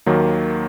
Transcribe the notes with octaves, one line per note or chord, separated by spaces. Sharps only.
D#2 D#3 F#3 A#3